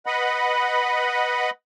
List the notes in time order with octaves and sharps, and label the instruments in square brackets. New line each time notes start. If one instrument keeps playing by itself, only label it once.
[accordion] B4 D#5 F#5 B5